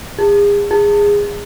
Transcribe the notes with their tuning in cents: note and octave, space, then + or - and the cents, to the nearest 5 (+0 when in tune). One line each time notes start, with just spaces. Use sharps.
G#4 -35
G#4 -20